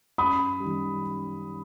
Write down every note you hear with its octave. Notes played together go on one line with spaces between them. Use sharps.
F#2 B5 D#6
D#3 G3